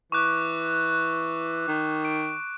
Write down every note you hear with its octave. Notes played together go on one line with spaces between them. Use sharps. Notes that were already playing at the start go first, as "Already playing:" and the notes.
E3 C#6 D6 F#6
D#3
D7